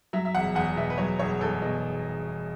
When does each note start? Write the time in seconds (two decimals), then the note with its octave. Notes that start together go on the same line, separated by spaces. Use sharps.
0.13 F#3 E5
0.25 E5
0.35 E1 F#5
0.55 E2 F#5
0.76 B2 E5
0.90 B4
0.98 F#3 C#5
1.19 E1 C#5
1.41 E2 A4
1.62 B2